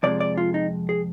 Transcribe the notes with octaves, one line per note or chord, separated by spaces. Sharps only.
F2 C3 F3 G#3 D5
D5
F4
D#4
G#4